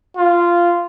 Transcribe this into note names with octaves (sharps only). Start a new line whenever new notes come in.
F4